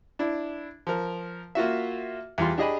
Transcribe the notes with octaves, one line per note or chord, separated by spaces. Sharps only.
D4 E4
F3 A#4
A#3 F4 F#4 E5
E2 G3 F4 C6
D4 G4 G#4 D#5 G#5 B5